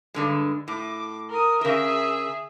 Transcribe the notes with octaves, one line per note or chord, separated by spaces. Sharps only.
G2 D3 G#3
A2 D6
A#4 D#6
C#3 G#4 A#4 E5